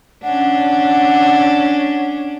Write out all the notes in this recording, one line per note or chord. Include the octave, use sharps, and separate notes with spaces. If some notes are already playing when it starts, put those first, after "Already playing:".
C#4 D4 F#5